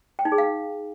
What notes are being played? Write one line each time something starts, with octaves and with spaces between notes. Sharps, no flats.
G5
D#4
G#4
F5